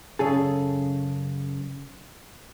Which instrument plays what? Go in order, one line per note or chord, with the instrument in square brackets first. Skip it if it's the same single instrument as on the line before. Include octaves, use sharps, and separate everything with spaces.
[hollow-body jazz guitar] F#2 C#3 G#4 A4